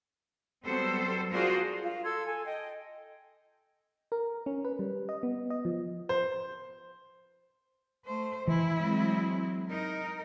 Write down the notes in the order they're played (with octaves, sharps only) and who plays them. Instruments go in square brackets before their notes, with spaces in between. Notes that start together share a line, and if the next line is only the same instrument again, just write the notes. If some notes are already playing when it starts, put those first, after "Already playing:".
[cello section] F#3 G3 B3 C4 A4 C5
D4 F4 F#4 G#4 A#4 C5
[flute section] F4
A4 C6 E6 G#6
A4 G#5
D#5 G5
[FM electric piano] A#4
C#4
B4
G3
D#5
B3
D#5
F3
[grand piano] C5
[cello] A3 C5
[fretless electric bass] E3 [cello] E4
[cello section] F#3 G#3 C4
[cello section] D#4 [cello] A#4